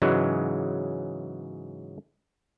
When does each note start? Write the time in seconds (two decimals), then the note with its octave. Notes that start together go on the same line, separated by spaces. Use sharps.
0.02 G#2 C#3 E3 F#3 G#3